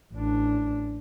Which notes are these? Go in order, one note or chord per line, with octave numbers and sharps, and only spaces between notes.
A1 D4